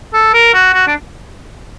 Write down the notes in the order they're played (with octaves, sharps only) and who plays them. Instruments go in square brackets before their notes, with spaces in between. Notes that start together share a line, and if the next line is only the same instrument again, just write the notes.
[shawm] A4
A#4
F#4
F#4
D4